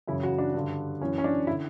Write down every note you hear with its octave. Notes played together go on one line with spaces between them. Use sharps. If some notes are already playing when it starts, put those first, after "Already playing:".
F#2 C#3 E3 E4
F#4
D4
G2 D3
F#2 E3 C#4
C#4
D4
E4
D3